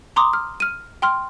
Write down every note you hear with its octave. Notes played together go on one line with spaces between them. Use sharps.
A#5 C6 D6 D#6
F6
F6 D#7
G5 C6 F6